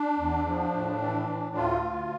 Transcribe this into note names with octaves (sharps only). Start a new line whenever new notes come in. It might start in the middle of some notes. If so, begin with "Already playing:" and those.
Already playing: D4
E2
F3
A2
E3
A2
D2 F4
D2